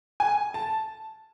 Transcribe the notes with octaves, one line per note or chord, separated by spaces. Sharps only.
G#5
A5